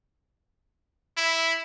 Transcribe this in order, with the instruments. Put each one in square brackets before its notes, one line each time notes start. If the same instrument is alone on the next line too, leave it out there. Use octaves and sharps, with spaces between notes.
[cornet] E4